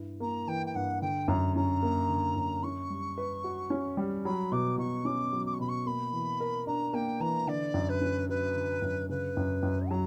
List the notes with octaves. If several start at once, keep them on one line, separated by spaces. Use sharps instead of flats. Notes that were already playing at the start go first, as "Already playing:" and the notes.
Already playing: G2 E4
A#3 A#5
E3 G5
G5
G2 F#5
D3 G5
F#2 A#5
C#4 A#5
A#3
D3
F#2
C#4 C#6
G3
B4
F#4
C#4
G3
F#3 B5
B2 D6
B2 C#6
C#4 D6
F#3
D6
C#6
B2 B5
C#6
A#3 B5
E3
A#4
D4 A#5
A#3 G5
E3 A#5
D3 D5
F#2
B4
C#4
F#3 B4
D3
F#2
C#3 B4
F#2
F#2
F#3 A#5